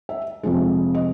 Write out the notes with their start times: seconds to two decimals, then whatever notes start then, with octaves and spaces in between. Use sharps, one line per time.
0.09 E5
0.43 F2 C3 F3 G#3
0.95 D#5